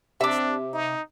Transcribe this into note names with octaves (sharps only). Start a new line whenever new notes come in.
C3 D4 E5 D6
D#4